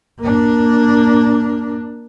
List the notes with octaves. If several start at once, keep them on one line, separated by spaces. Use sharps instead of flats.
A#3 D4